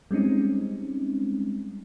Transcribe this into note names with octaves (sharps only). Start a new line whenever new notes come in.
G3 G#3 C4 C#4 D#4